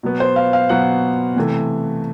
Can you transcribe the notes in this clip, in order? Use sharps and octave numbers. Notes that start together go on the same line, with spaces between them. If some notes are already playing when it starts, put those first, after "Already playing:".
B2 F#3 B3
C5
F5
F5
B2 F#3 B3 F#5
C3 E3 A3